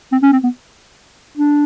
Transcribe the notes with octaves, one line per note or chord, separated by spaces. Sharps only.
C4
C#4
C4
B3
D4